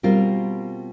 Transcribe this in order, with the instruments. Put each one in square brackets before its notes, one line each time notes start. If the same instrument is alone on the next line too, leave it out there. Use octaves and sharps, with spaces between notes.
[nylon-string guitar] B2 G3 C4 F4 A#4